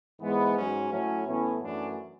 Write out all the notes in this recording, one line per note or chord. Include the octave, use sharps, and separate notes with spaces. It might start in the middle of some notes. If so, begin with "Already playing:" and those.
G#2 E3 G#3 B3
G#2 F#3 C#4
A2 F#3 A3 C#4
A2 E3 B3 C#4
F#2 E3 A3 C#4 D4